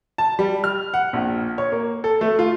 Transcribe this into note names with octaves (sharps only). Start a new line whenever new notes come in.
A5
G3
F6
F#5
A#1
C#5
A#3
A4
A3
F4